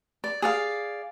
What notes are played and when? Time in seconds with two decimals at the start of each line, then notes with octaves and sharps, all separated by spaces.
0.24 D5
0.42 G#4 D5 F5